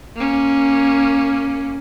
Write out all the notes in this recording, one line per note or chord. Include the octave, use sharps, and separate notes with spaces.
A#3 C#4